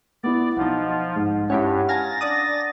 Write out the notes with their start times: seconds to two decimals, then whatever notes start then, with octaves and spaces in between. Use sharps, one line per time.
0.23 B3 E4 D5
0.57 B1 F3 D#4 F#5
1.16 G#2
1.50 G2 C#4 E4 G4 F#5
1.89 F5 G#5 A#5 A6 A#6
2.21 D4 D5 D#6